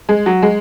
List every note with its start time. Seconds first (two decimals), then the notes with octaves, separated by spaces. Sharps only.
0.09 G#3
0.26 F#3
0.43 G#3